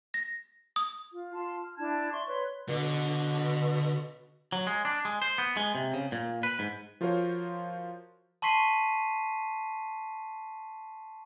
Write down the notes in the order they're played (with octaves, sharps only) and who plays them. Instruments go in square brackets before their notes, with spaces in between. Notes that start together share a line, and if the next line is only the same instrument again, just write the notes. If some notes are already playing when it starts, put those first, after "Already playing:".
[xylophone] A#6
D#6
[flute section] F4
F4 F5 A5 C6
F6
D4 E4 A5 G#6
D5 E5 C6 C#6
B4 C#5 C6
[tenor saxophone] B2 [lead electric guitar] D3
[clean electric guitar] F#3
G#3
D4
G#3
C5
B3
G#3
C3
C#3
A#2
B4
G#2
[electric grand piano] F3 F4 F#4 A#4 C5 C#5
[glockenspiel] A5 C6 C#6 B6 C7 D#7